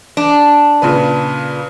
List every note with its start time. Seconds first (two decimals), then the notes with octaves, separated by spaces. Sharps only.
0.17 D4
0.82 A#2 C#3 B4